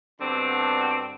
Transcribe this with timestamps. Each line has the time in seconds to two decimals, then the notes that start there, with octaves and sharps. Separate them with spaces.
0.21 G2 B2 D3 C4 D4 F#4